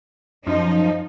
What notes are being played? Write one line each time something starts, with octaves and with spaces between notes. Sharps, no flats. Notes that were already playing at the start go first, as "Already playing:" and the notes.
F#2 F3 D#4